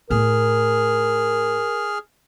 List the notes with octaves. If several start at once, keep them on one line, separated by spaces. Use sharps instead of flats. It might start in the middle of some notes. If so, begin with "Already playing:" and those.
A2 A3 G#4 A#4 F6